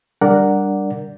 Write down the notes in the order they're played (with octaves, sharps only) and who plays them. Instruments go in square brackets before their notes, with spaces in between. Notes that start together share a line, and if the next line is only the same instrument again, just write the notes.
[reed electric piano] G3 D4 A#4 D5 F#5